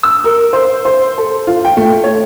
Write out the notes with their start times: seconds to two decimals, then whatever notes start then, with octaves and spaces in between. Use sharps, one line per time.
0.03 E6
0.24 A#4
0.53 C5
0.85 C5
1.18 A4
1.47 F4
1.65 G5
1.77 A3
2.04 C#5